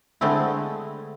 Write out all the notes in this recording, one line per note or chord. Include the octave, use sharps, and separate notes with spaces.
D3 G#3 A3 B3 C4 E4